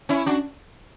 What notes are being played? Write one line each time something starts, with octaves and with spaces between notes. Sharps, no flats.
C#4 E4
D4 F#4